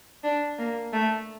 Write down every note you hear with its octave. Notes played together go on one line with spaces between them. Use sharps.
D4
A#3
A3